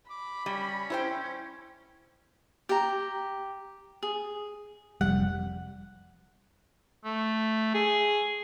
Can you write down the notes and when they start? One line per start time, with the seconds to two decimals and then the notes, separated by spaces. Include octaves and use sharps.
0.10 B5 D6
0.46 G3 C#4
0.90 E4 C5 G5
2.69 G4 A#5
4.03 G#4
5.01 F1 F2 G3 F#5
7.05 A3
7.74 G#4